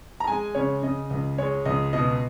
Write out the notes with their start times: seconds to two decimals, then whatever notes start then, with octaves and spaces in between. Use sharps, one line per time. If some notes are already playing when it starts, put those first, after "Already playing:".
0.20 A#5
0.27 G#3 G#5
0.55 C#3 C#5
0.83 C#3 D#5
1.10 C#2 D#5
1.38 G#3 C#5
1.65 C#2 D#5
1.93 B2 D#5